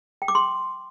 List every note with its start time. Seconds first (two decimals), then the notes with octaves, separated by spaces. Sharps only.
0.22 G5
0.28 D6
0.35 C6